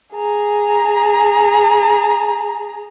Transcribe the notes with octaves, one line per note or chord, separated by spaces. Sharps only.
G#4 A#5